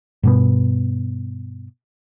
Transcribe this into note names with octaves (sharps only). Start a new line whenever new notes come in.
G2 B2 B3